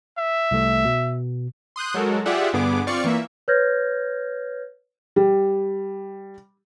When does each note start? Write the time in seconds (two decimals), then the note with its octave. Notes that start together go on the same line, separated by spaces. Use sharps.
0.18 E5
0.51 C2 A3
0.85 B2
1.76 C6 D#6 F#6 G6
1.94 F#3 G#3 F#4 A4 A#4
2.26 F4 G4 G#4 D5 E5 F#5
2.53 G2 D3 B3 G#4 D6
2.87 C4 F4 D5 F5 C#6 C#7
3.04 E3 A#3 E5
3.48 B4 C#5 F6 G6 G#6 A#6
5.16 G3